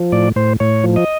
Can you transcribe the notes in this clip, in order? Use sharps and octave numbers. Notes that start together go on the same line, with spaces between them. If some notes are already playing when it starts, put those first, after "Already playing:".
Already playing: F3
A2 D5
A2 C5
A2 C#5
F3
D#5